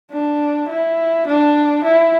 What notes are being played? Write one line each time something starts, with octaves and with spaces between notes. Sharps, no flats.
D4
E4
D4
E4